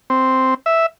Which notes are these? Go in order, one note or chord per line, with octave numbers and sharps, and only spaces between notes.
C4
E5